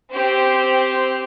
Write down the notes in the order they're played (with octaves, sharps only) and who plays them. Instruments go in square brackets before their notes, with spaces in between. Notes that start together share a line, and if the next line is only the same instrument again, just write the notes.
[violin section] C4 G4 C5